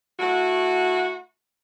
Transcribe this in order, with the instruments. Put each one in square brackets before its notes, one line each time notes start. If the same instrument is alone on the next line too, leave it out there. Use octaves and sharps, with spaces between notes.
[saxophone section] A3 E4 F#4